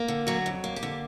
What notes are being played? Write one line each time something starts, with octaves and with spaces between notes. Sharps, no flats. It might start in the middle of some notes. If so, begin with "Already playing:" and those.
Already playing: A#3
D3
F#3 F#4
F2
A#3
G4
D3